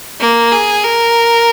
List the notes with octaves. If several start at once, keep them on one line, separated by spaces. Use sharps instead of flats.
A#3
G#4
A#4